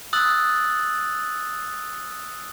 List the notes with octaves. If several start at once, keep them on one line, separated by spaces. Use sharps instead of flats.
D#6 E6 F#6 A6 F#7